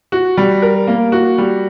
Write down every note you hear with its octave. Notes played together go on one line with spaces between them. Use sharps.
F#4
G3
A#4
A#3
F#4
G3